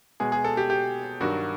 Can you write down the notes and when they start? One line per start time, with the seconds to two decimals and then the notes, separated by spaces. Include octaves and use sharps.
0.20 B2 G#3 G#4
0.32 G#4
0.44 A4
0.57 G4
0.70 G4
1.21 G2 D#3 F#3 F#4